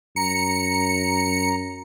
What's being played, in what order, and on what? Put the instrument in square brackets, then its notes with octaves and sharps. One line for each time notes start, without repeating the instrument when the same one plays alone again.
[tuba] F#2 [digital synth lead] A#5 [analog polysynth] C#7